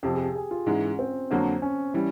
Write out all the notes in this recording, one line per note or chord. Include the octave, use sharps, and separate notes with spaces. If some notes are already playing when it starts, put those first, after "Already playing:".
F2 C3 F3 G4
G#4
G4
G#4
F4
G#2 E3 G#3 C#4
C4
F2 D3 F#3 A#3
C#4
E3 G3 C#4